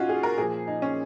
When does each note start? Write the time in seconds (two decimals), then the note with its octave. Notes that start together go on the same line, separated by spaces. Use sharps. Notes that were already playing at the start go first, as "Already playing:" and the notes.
Already playing: A#2 C#4 D#4 F4 F#4
0.09 G#4
0.23 A#4
0.37 A#2 F3 G#4
0.67 D#4
0.82 C#4